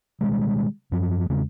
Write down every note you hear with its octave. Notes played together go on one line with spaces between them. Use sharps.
B2 D#3 G3 G#3
F#2 F3
E2 C#3 G#3